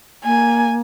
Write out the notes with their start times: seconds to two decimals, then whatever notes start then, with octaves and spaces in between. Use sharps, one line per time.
0.25 A#3 G#5